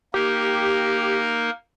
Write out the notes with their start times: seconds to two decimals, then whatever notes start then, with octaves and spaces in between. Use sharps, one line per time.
0.14 A#3 D#4 G4 A#4